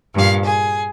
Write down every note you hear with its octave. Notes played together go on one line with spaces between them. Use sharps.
G2 A#2 F5
G#4